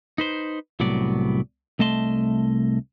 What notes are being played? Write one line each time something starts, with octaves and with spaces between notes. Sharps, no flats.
D#4 B4 C5
C2 A2 F#3 B3 D5
C2 A3 D#5 A5 C6